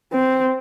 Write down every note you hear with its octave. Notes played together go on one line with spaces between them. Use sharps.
C4